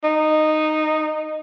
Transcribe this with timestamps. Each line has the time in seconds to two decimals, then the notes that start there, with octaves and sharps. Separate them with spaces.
0.04 D#4